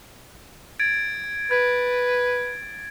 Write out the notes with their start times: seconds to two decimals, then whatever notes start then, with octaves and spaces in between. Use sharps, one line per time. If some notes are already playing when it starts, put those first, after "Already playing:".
0.80 G#6 A6 D7
1.51 B4 G#6